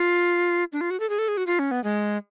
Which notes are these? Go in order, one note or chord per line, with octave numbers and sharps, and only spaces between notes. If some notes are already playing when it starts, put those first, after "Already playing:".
Already playing: F4
D4
F4
F#4
A4
G#4
A4
G#4
F#4
F4
C#4
B3
G#3